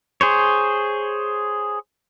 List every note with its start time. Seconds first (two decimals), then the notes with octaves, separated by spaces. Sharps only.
0.21 G#4 C5 C#5